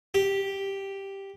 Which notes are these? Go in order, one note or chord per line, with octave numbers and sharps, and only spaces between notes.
G4